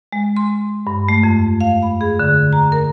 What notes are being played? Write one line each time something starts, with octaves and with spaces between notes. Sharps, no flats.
G#3
C6
G2
A3
F2
F5
B5
G#4
D3
A#5
A#4